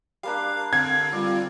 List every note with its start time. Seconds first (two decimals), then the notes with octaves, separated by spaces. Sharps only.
0.23 G3 A#3 D4 F5
0.73 D3 C4 F5 G#6
1.13 G3 F4 D5